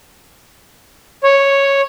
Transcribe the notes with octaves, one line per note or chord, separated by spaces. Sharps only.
C#5